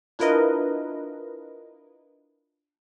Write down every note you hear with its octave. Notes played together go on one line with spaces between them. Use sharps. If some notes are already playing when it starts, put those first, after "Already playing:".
D4 E4 F4 A#4 B4 D#5